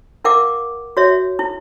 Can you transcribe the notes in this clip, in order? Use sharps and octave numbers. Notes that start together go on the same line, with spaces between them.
E4 A#4 F5 F#5 D6
F#4 C#5 E5
E4